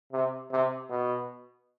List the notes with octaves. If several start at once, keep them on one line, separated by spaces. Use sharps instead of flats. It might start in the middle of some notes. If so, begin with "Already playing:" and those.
C3
C3
B2